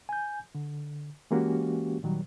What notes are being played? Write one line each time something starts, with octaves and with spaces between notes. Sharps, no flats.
G#5 G6
D3
E3 G#3 A#3 C#4 F#4 G4
A#2 D#3 F#3 G3